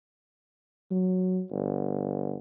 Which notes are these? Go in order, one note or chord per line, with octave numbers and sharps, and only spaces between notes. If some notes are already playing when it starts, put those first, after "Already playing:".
F#3
G1